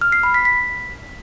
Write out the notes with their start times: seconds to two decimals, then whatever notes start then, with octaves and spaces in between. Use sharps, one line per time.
0.01 F6
0.12 C7
0.23 B5
0.34 B6
0.45 B6